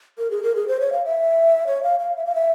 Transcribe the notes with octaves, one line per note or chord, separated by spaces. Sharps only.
A#4
G#4
A#4
G#4
C5
C#5
F5
E5
C#5
F5
F5
E5
F5
E5